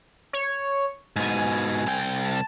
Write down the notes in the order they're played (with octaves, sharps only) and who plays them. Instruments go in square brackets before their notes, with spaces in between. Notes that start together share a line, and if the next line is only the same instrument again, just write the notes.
[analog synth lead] C#5
[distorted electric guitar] G#2 B2 [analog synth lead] G#5
[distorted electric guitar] C2 G5
[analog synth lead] A5